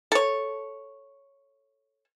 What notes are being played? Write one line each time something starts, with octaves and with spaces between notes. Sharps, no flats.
A4 C#5